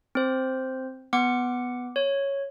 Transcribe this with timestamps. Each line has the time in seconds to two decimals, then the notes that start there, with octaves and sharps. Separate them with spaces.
0.15 C4 C5
1.13 B3 F#5 D6 C#7
1.96 C#5